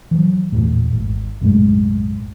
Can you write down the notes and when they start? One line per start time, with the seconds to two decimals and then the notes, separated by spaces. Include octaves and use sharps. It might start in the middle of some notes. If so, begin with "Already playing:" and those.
0.11 E3 F#3
0.52 A#1 E2 A2
0.93 G#1
1.41 B1 F#2 A2 G#3